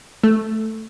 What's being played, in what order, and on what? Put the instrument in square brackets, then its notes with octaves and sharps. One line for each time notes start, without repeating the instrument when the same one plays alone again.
[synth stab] A3